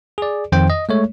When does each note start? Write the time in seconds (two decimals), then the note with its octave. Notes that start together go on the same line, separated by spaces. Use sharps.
0.18 G#4 D5
0.52 F2 D#3 C5 G5
0.70 D#5
0.89 G#3 A3 C#5